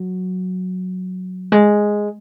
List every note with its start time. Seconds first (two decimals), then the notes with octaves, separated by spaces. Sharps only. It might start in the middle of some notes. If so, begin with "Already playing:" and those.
Already playing: F#3
1.52 G#3